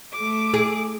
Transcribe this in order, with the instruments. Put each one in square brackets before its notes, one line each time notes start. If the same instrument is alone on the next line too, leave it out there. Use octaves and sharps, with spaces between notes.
[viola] A3 D6
[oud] G#4